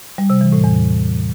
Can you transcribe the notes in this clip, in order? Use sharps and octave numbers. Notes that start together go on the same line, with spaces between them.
G3
C3
E3
A2
E2